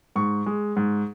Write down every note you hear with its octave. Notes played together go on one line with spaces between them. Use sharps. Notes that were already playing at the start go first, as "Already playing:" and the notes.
G#2 C#6
G#3
G#2